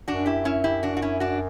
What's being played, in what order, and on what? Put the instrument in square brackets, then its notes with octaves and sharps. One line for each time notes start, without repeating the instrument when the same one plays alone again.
[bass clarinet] F#2 [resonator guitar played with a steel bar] D4 F#4
[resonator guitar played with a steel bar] E4 G4
C#4 E4
E4 G4
D4 F#4
F#4
C#4 E4
D4 F#4